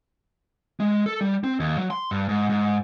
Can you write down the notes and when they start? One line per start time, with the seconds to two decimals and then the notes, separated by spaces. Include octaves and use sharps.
0.80 G#3
1.06 A4
1.21 G3
1.44 C4
1.60 D#2
1.78 F#3
1.90 C6
2.11 G2
2.29 G#2
2.49 G#2